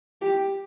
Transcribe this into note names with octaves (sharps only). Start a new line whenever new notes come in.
G4